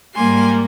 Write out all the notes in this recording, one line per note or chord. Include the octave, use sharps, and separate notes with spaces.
G#2 G3 A#3 G#5 C6